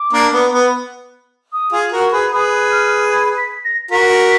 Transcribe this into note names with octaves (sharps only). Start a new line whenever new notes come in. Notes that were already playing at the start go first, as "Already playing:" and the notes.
Already playing: D6
A#3 D4
B3
B3
D#6
F4 G#4
F#4 A#4
G#4 B4
G#4 B4 D#6
F6
G#6
B6
A#6
F#4 A#4 B6